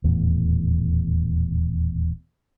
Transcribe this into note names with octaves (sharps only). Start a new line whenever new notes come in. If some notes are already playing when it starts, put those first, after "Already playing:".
D#1 E2 A2